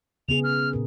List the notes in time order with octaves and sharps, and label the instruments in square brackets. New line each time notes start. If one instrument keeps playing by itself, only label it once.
[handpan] C#3 B3 G#4 [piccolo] F7
[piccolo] F6
[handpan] A#2 A#4